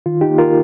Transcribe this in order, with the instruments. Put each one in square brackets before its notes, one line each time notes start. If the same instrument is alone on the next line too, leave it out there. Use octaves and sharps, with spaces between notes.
[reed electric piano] D#3 F4
D#4 G4
A#3
F4 A#4